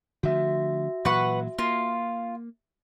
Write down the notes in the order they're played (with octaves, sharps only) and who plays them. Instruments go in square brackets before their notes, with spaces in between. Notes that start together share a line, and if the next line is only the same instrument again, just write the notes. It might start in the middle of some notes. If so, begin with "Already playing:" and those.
[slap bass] D3 F3 A3 [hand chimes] F#4 E5
[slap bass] A#2 E3 F#3 [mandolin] B4 F#5 C#6
[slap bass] A#3 [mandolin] F4